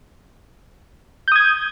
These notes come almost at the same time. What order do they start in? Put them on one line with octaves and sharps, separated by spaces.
G6 D#6 G#6